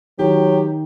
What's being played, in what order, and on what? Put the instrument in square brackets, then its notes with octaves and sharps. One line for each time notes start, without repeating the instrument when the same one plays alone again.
[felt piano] D#3 [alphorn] F#3 [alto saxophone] G4